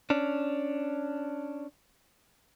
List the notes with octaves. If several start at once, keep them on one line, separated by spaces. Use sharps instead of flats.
C#4 D4